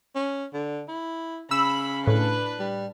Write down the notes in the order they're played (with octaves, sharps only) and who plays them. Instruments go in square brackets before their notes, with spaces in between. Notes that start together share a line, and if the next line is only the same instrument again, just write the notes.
[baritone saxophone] C#4
D3
E4
[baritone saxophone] C#3 [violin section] B5 [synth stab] E6
[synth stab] A2 [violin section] D4 B4
[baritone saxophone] G3